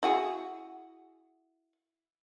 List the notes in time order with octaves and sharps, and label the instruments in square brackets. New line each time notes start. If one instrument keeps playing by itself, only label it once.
[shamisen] E4 F#4 G#4